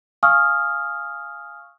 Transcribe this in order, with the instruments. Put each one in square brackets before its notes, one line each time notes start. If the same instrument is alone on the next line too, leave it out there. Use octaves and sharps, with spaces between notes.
[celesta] F5 G#5 C#6 D#6 F6